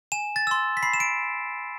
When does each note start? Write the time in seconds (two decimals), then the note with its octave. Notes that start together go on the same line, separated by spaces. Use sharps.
0.12 G#5 E7
0.36 A6
0.47 C6 E6
0.77 B6
0.83 B5 C7
0.94 E7
1.00 D7